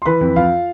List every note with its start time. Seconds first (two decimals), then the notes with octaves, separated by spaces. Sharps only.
0.02 C6
0.06 E3 B4 B5
0.21 F2
0.36 F2 F4 F5